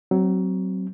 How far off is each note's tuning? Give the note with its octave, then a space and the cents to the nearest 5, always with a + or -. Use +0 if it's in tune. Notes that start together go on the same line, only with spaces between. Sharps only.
F#3 +25 C4 +0